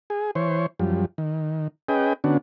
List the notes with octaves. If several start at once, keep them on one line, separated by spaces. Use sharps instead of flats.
G#4
E3 C5 C#5
F#2 F3 G3
D#3
C#4 G#4 B4 D#5 G5
D3 B3 C#4 D4 F#4